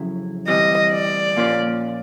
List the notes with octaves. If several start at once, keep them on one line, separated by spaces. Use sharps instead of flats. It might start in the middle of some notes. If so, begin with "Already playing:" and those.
Already playing: F2 C#3 F#3 E4
D2 C3 E3 G3 D#5
D5
A#2 F3 A#3 C#4 F4